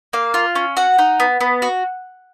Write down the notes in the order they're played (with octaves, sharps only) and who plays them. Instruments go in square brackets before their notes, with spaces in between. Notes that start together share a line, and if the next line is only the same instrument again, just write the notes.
[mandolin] A#3 F5
F4
C#4
F#4 F#5
D#4
B3
B3
F#4